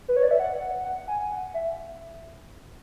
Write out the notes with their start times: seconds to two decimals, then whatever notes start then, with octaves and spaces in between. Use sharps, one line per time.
0.08 B4
0.17 C#5
0.23 D5
0.31 E5
0.39 F#5
0.84 F#5
1.08 G#5
1.31 F#5
1.54 E5